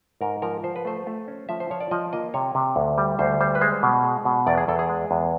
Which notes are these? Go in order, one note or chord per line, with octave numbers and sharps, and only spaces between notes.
G#2 A#4
F3 A#4
F3 C5
B4
A3 C5
A3
C#4
F3 E5
C5
F3 C#5
D5
F3 D#5
A#3 D#5
C3 C#5
C3
D2
G3
D2 C5
G3 C5
B4
G#3 C5
B2
G#3
B2
E2 D5
G#4
E2 A4
G#4
G#3
E2